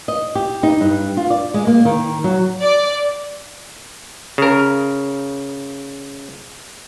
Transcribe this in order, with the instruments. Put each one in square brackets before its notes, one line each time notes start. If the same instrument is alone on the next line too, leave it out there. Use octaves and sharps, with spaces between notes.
[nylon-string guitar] D#5
G4
D#4
G2
F4
D5
G#3
A#3
D#3
F#3
[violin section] D5
[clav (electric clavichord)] C#3 A#4